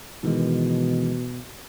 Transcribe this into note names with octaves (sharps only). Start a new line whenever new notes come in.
B2 D#3 E3 G#3